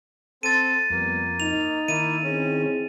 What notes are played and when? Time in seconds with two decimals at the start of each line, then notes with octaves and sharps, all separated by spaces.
0.43 C4 A4 A5 A6 D#7
0.90 F2 G3 A#3 B3
1.40 D#4 F7
1.88 D#3 A#3 E4 D#7
2.23 C4 C#4 E4 G#4